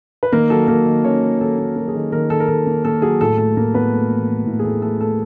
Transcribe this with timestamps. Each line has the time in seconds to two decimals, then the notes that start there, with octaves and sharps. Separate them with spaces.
0.23 B4
0.32 D#3 A#3 A#4
0.50 F#3 A4
0.68 D#3 A#3 A#4
0.86 D#3
1.04 D#3 C#4 C#5
1.22 D#3
1.41 D#3 A4
1.59 A#3
1.76 F#3 A#3 A#4
1.88 G#4
1.94 D#3 A4
2.12 D#3 A#3 A#4
2.30 D#3 A4
2.40 A#4
2.48 D#3 A4
2.66 A#3
2.85 A#3 A4
3.02 F#3 G#4
3.21 A2 A4
3.38 A3 A4
3.56 A2 A#3 A#4
3.74 A2 B3 B4
3.93 A3
4.10 E3
4.28 A3
4.46 A2
4.59 G#4
4.64 A2 A4
4.82 A3 A4
5.01 A3 A4